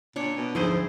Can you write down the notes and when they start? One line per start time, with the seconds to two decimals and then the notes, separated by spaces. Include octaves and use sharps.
0.16 A#2 D4 C#5 D5
0.36 B2
0.55 D2 G#2 F3 E4 G#4 C5